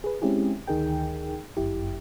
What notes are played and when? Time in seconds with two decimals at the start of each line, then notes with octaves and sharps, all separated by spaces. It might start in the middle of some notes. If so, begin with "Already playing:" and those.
0.04 G#4 B4
0.22 G#3 C4 C#4 E4 G4 G#4
0.68 D2 D#3 D#4 G#4 A#4 G5
1.57 G1 F#2 E4 G4